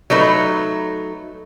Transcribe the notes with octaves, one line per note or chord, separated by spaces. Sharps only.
F#3 A3 D#4 B4